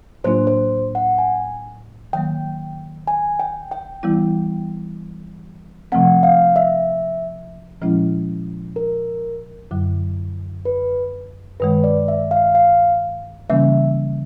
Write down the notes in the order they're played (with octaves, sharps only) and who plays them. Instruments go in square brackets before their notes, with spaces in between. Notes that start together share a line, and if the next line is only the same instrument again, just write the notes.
[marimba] A2 F#3 A#3 D4 F4 [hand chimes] C5
[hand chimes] C5
F#5
G#5
[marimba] D#3 F#3 A#3 [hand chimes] G5
[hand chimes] G#5
G5
G5
[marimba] E3 G3 B3 E4
[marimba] C3 F3 A3 C4 [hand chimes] F#5
[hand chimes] F5
E5
[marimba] A#2 F3 G#3 C#4 E4
[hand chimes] A#4
[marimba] F#2 D3 F#3
[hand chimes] B4
[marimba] G2 D#3 G#3 [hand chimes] B4
[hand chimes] D5
E5
F5
F5
[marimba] C#3 E3 G3 A#3 C#4 [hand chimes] E5